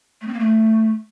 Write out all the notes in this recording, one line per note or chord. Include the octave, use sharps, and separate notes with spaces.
A3
C4
A#3
A3